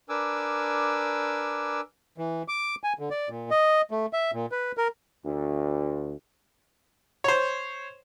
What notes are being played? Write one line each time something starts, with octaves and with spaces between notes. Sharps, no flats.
D4 A#4 B4 G#5 D6 E6
E3
D6
G#5
D3
D5
A#2
D#5
A3
E5
A#2
B4
A#4
D2
C5 C#5